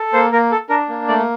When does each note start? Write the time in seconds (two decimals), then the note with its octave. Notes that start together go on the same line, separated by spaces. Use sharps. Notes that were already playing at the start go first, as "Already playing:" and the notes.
Already playing: A4
0.13 A#3 C5
0.32 A#3 A#4
0.51 A4
0.69 D4 A#4
0.89 A#3
1.08 A3 D5